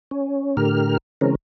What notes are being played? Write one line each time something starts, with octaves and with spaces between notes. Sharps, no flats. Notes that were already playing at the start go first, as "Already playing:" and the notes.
C#4
A2 D3 G4 A#4 F6
C#3 E3 G#3 C4 C#4 A#4